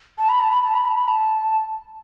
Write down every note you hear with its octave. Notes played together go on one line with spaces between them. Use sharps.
A5
B5
A5
B5
A5
B5
A5
B5
A5